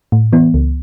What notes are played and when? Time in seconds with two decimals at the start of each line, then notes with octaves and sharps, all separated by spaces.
0.12 A2
0.33 E3 B3
0.54 C#2